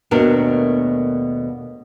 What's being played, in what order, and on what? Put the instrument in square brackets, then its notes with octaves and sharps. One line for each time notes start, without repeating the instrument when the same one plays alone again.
[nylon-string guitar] D#2 B2 A3 D4 A#4